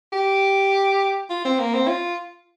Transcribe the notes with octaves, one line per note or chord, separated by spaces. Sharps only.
G4
F4
C4
A#3
C4
F4